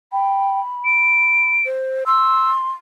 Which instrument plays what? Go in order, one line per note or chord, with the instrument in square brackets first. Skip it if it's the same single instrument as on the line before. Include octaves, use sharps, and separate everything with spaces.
[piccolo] G5 [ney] B5
[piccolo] D7
[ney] C5
[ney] C6 [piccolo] E6